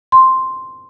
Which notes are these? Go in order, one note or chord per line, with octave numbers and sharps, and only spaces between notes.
C6